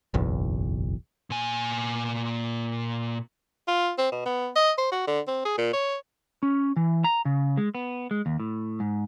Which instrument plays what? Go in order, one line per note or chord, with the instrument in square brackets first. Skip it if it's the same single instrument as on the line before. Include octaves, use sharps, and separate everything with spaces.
[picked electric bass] F#1 B1 E2
[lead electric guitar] A#2 G#5
[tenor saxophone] F4
C4
B2
B3
D#5
C5
F#4
D3
C4
G#4
A#2
C#5
[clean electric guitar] C#4
E3
A#5
C#3
G#3
B3
G#3
D#2
A2
G#2